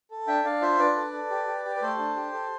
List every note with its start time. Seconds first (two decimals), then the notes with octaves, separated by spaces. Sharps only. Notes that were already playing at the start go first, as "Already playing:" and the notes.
0.11 A4
0.27 D4 E5 G5
0.45 D4 D5 F5
0.62 F4 C5 E5
0.79 D4 B4 D5
0.96 A4
1.13 A4
1.31 G4
1.48 G4
1.65 G4
1.76 B4
1.82 A3 A4 C5
1.99 D4
2.16 G4
2.33 A4